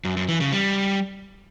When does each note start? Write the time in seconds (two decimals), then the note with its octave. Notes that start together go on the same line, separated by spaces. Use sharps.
0.05 F#2
0.17 F#2
0.28 E3
0.40 C#3
0.52 G3